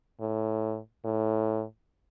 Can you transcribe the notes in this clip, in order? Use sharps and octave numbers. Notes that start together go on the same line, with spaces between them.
A2
A2